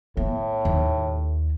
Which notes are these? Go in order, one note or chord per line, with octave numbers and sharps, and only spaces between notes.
A2 B3
D#2